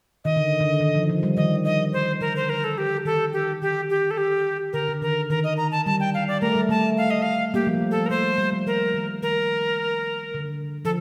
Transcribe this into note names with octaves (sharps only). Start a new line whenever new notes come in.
D#3 D#5
D3
D3
D#3
F3
F3
G3
D#3 D#5
D#5
D#3 C5
D3 A#4
C5
A#4
A4
G4
D#3 A4
G4
D#3 G4
G4
A4
G4
D3 A#4
D3
D#3 A#4
D#3 A#4
D#5
A#5
A5
G3 A5
G5
F5
D5
A3 A#4
G3
A3 A5
F5
D#5
F5
G3 A#3 G4
F3
G3
A3
A4
A#4
A3 C5
G3
G3
F3
D#3 A#4
D#3
D#3 A#4
D3
F3 A4